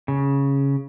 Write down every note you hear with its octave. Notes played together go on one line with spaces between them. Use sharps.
C#3